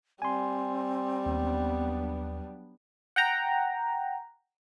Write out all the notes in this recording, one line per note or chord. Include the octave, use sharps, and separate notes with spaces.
G3 C4 G#5 C6
D#2 F#3 B3 D4
F#5 G5 A#5